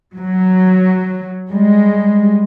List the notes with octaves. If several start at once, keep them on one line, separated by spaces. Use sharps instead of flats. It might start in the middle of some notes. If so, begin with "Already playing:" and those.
F#3
G3 G#3